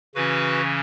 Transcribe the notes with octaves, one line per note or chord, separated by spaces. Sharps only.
C#3 E3 C#4 F#4 B4